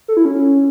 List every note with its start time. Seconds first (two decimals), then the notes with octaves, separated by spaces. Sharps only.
0.08 A4
0.17 E4
0.25 C#4